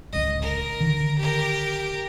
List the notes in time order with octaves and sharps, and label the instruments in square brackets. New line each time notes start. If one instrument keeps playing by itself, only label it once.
[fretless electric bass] D1 G#1 C#2 [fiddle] D#5
[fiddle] A#4
[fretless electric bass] D3 D#3
[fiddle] G4 A#4